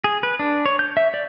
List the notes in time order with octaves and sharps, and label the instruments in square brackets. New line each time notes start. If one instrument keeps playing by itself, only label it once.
[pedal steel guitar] G#4
B4
D4
C#5
G6
E5
D5